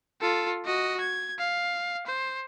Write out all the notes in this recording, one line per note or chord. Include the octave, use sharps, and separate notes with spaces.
F4 A4
F#4 D#5
G#6
F5
C5